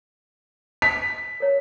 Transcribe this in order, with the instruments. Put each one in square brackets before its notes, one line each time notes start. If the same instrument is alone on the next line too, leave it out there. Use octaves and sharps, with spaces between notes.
[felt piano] B6
[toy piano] A#4 C#5